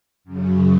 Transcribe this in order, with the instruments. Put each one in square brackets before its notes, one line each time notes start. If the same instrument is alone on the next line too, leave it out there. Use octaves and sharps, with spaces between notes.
[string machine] F#2 C#3 F#3